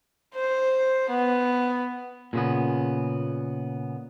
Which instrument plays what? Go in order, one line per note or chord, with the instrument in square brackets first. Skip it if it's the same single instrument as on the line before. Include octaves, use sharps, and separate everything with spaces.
[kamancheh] C5
B3
[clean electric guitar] A#2 C#3 B3